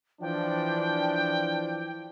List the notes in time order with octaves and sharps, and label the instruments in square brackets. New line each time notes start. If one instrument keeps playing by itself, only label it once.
[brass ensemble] E3 F3 D4 [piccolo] G5